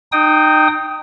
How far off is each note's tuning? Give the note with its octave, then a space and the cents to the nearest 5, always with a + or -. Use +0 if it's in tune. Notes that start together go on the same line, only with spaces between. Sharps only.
D#4 -30 G5 +0 D#6 +15